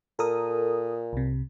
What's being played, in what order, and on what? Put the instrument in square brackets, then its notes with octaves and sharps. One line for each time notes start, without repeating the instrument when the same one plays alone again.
[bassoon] A#2 [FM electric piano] A4 A#4 D#6
[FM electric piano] C2 C3